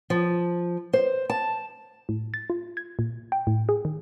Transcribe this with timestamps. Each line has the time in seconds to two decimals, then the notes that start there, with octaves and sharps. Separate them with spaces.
0.10 F3
0.93 C5
1.30 A5
2.09 A2
2.34 A6
2.50 F4
2.77 G#6
2.99 A#2
3.32 G5
3.47 A2
3.69 G#4
3.85 D#3